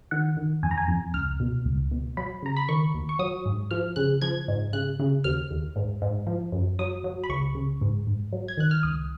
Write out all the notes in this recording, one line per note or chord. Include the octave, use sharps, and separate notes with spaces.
D#3 F#5
D#3
F2 G#5
A#5
G#5
F2
C#2 F6
B2
C#2
B2
F#3 B5
C#3 A#5
B5
D#3 C#6
D#2
C#6
F#3 D#6
G#2
F3 F6
C#3 F#6
F3 G#6
G#2
C#3 F#6
C#3
D#2 F6
D#2
G#2
G#2
F3
F#2
F#3 D#6
F#3
B5
C#2 C#6
C#3
G#2
G#2
F#3
G#6
D#3 F#6
F6
C#2 D#6